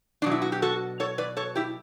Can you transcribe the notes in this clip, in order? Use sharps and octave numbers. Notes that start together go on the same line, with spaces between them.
B2 F#3 D4
E4
F#4
G4
F#4 A4
A4 C#5
B4 D5
A4 C#5
E4 G4